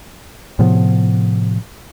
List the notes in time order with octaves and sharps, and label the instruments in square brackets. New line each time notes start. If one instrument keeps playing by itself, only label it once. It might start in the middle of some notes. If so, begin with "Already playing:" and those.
[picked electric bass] A2 C3 F3 B3